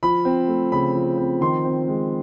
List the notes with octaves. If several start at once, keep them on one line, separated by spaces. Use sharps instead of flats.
F3 B5
C4
A3
C#3 B5
F3
C4
D#3 C6
C4
G#3